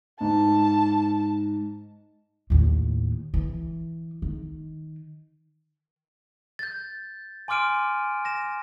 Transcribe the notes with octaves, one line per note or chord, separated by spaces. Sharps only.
G#2 A5
D#2 A2
E3
D#3
G6 A6
G#5 C6 D6 F6 D7 D#7
A#6 E7